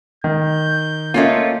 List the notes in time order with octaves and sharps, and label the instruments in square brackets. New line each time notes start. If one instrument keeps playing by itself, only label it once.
[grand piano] D#3 [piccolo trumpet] G6
[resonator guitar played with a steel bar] A3 C#4 F4 [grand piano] A#3 D#5